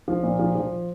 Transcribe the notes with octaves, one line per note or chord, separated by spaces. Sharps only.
F3
A#2
F3
F3